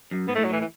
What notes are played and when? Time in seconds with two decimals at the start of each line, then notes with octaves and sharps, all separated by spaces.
0.11 F#2
0.28 G#2 B3
0.35 A3
0.38 A2
0.44 F#3
0.49 A2 E3
0.60 E3